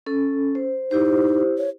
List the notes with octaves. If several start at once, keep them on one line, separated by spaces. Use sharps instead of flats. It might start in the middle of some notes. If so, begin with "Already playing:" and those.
C#4 A4
C5
D#4 E4 G4 C5
C#5